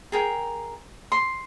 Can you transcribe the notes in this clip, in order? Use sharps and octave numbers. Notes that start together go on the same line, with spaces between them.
G#4 A#4 G5
C6